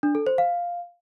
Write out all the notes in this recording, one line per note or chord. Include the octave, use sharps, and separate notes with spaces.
D4
A4
C5
F5